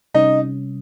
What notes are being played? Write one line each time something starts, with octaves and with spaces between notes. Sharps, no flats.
C3 G3 C#4 D#4